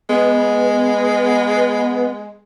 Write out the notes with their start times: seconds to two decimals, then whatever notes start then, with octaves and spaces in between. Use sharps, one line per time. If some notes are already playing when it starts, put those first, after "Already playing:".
0.09 G#3 B3